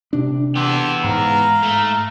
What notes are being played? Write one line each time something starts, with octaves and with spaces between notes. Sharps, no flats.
C3 D4
E3 B3 G4 A4 C6
G#2 F5 A#5
A3